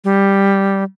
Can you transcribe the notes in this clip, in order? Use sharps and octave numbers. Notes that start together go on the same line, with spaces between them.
G3